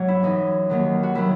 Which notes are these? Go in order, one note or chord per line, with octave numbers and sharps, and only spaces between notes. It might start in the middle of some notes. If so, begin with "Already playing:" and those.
Already playing: G#2 F#3 C#5
E4
F#2 E3 D#4
D#2 D#3 F#3
F#4
D#3 F#3 E4